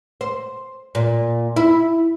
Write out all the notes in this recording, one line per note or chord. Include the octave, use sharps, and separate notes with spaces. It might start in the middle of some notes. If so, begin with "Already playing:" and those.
C5
A#2
E4